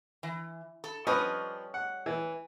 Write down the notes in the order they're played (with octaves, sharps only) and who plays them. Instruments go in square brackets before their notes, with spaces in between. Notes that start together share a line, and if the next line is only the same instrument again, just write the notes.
[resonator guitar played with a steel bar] E3
A4
[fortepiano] F3 B4 [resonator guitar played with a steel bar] G3 C#4 D#5
[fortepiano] F#5
E3